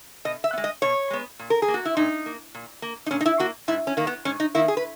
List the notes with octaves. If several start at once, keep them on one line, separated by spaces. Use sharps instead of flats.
B2 D#5
E5
B3
G#3
D#5
B2 C#5
G#3 B3
A#2
A#4
G#4
A#3
F#4
E4
A#2 D#4
A#3
A#2
A#3
D#4
A#2 C#4
D#4
E4
A#3 F#4
G#2 E4
C#4
D#3 A#3
B3
G#2 C#4
D#4
D#3 A#3 E4
G#4
B4